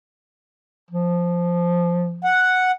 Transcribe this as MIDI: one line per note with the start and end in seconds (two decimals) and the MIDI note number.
0.91 2.31 53
2.24 2.71 78